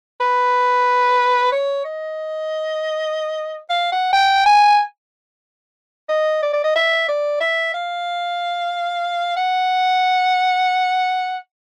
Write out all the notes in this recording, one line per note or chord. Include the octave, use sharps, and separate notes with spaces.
B4
C#5
D#5
F5
F#5
G5
G#5
D#5
D5
D5
D#5
E5
D5
E5
F5
F#5